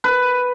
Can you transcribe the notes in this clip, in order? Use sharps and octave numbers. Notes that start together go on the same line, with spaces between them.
B4